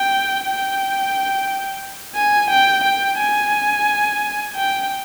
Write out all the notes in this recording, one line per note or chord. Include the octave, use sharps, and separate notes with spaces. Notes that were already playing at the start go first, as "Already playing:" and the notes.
Already playing: G5
G5
G#5
G5
G5
G#5
G5